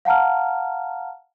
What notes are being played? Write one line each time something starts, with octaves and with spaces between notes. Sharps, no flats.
F5 F#5 A5 A#5 F6